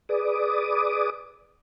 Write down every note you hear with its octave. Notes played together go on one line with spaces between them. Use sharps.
G#4 B4 D5 D6 D#6